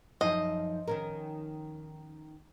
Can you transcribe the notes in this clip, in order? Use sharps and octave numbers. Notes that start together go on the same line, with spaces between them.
F#2 F3 D#4 D#5
D#3 C#4 A#4